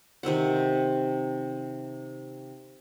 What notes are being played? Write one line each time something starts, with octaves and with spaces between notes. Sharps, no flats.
C3 D#3 C4 F#5